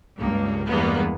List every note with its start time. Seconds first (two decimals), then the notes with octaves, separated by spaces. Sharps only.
0.18 C#2 G2 A#3
0.67 E2 G2 G#3 A#3 B3